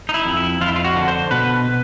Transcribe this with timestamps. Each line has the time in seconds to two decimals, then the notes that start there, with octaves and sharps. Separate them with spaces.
0.09 D#4
0.14 E4
0.25 F2
0.37 E4
0.61 F2 F4
0.68 E4
0.76 F4
0.84 F#4
0.96 D3
1.08 C5
1.31 B2 B4